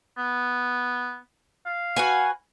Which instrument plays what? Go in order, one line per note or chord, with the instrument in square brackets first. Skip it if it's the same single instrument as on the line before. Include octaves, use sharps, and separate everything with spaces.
[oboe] B3
F5
[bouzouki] F#4 B4 G#5